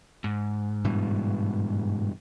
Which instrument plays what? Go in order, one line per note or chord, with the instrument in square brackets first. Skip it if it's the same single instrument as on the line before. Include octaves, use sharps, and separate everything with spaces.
[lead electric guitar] G#2
[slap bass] G2 B2 E3